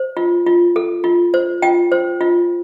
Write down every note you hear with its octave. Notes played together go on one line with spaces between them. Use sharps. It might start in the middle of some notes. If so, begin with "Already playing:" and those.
Already playing: C5
F4
F4
A4
F4
C5
F4 G5
C5
F4